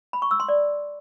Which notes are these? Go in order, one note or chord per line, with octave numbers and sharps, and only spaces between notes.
B5
C#6
E6
C6
D5